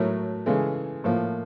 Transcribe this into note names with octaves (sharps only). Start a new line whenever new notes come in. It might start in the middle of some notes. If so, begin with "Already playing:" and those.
Already playing: A2 F#3 A3 A#4
C#3 E3 G#3 A4
A2 F3 A#3